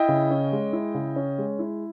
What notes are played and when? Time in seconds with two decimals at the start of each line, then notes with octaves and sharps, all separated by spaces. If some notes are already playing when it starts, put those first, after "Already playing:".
Already playing: E4 D#5 G5
0.08 C#3
0.31 C#4
0.52 G#3
0.73 E4
0.94 C#3
1.16 C#4
1.38 G#3
1.59 E4